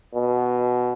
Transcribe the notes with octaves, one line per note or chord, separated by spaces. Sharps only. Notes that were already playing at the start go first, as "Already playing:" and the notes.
B2